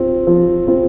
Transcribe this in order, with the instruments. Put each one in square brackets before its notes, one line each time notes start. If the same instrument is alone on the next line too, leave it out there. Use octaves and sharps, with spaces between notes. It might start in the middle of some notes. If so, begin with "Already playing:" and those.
Already playing: [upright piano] C4 F4
F3
C4 F4